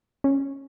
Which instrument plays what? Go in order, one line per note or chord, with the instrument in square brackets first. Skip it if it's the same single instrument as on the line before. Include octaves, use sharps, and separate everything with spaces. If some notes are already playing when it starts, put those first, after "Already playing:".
[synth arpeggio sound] C#4